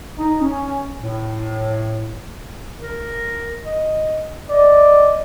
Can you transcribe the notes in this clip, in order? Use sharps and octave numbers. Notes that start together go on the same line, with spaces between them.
D#4
C#4
A2
A#4
D#5
D5 D#5